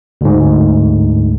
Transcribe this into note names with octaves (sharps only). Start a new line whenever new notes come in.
D2 G#2